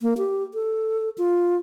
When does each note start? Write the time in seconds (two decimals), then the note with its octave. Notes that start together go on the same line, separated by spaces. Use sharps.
0.02 A#3
0.18 G4
0.54 A4
1.18 F4